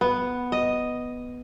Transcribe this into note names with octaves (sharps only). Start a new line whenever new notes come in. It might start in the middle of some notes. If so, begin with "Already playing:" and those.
B3
D#5